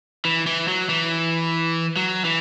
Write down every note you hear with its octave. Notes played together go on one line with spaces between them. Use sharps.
E3
E3
F#3
E3
F#3
E3